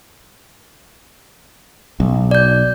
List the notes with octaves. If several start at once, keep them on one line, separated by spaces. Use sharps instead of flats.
B1
D5 G6